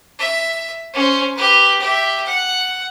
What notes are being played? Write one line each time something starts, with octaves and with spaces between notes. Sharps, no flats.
E5
C#4 C5
G4 B4
G4 E5
F#5